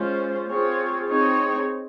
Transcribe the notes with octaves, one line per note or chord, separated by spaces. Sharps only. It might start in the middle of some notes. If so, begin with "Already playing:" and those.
Already playing: G#3 C#4 F4 C5
C4 F4 G#4 C#5
C4 D#4 G#4 C#5